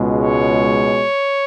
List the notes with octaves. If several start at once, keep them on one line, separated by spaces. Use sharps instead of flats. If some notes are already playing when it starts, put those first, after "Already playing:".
Already playing: C#2 B2 G#3
C#5